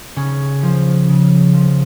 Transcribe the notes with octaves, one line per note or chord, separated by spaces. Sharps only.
C#3 C#4
F3
C#3
F3